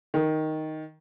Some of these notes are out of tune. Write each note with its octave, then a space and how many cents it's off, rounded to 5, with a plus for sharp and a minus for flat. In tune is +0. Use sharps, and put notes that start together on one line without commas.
D#3 +5